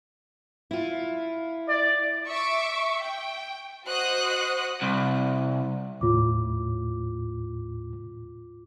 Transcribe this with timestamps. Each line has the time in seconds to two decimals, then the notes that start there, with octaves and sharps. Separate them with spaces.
0.71 E4 F4
1.69 D5
2.28 E5 C#6 D6
3.00 G5
3.86 F#4 C5 D#5 F#5 D#6 F#6
4.82 C2
6.01 D#2 A2 F4 D6